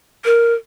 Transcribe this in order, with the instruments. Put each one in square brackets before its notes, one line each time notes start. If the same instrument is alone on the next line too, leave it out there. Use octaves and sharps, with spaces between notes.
[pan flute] A#4